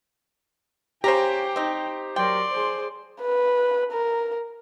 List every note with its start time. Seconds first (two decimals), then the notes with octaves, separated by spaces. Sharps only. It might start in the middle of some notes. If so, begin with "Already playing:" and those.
1.04 C#3 C#4 G4 C5 G5 A#5
1.56 C4 D#4
2.16 F#3 A#4 D5 G5 C6
2.51 G#4 C5
3.22 B4
3.92 A#4